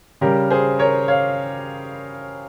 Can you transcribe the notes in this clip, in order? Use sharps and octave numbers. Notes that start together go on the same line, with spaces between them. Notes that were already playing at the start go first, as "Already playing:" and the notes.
C#3 G3 G4 A#4
G#4 C5
A#4 C#5
C#5 F5